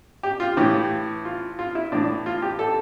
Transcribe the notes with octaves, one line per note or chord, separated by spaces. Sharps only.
G4
F4
A2 E3 G4
F4
F4
E4
A2 E3 D4
F4
G4
A4